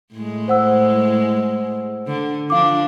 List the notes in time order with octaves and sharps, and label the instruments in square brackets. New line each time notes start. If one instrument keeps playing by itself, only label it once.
[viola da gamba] A2 G#3
[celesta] C5 F#5 E6
[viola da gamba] D3
[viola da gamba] F3 D4 [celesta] F5 D6